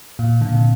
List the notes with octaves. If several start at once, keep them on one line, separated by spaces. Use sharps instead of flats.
A#2
A#2 D3
C3